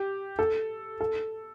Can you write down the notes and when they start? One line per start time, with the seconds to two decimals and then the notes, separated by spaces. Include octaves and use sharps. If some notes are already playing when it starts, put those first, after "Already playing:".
Already playing: G4
0.39 A4
1.01 A4